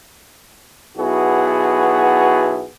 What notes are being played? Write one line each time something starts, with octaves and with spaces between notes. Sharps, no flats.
B1 B3 E4 F#4 G#4